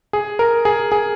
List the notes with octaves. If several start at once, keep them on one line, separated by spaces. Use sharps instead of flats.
G#4
A#4
G#4
G#4